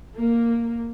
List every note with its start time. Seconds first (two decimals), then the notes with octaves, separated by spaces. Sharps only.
0.16 A#3